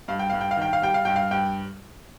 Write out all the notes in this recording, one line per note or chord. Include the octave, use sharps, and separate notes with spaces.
G2 F5
G5
G2 F5
G5
F5
D#3 G5
F5
G3 G5
F5
G2 G5
F5
G2 G5